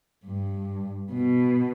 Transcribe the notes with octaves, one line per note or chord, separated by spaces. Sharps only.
G2
B2